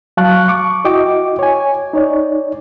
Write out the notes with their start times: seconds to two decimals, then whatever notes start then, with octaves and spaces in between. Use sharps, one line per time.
0.17 F#3 F5 A5 C#6 F#6
0.48 C#6 D6
0.85 E4 F#4 D#5 G5 D6
1.39 C#5 G#5
1.93 D#4 C#5 D5